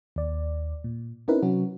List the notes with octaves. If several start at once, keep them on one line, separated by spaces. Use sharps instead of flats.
D#2 D5
A#2
C4 C#4 D#4 E4 A#4 B4
C3 F#3 C#4 F#4